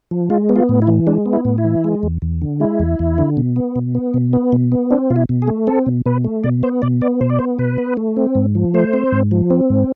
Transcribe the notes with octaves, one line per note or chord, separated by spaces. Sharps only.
F3
G#3 F4
B3
F4
A2
E4
E3
G#3 D4
B3
E4
A2
E4
E3
G#3
E2
E2
D3
G#3 E4
E2
E2
D3
B2
B3
B2
B3
B2
B3
B2
B3
C4 D4
B2 F4
E4
B2
G#4
A3
C4 A4
B2
B2 B4
A3
B2 D5
B3 C5
B2 D5
B3 D5
B2 C5
D5
B3 C5
B2 B4
B3
A3
C4
G#2
F3
A3 C5
C4
G#2
F3
C4
G#2